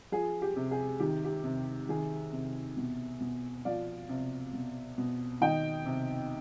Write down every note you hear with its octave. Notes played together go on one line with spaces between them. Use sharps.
F3 G#4
G4
C3
G#4
D#3 G4
G4
C3
D#3 G#4
C3
B2
B2
F3 D5 F5
C3
B2
B2
D#3 D#5 G5
C3